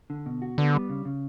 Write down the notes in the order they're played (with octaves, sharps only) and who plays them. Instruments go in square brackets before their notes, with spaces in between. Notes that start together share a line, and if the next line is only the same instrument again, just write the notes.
[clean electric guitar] D3
B2
F#4
[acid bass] D3 [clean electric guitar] B3
[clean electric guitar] G3
C#3
C#3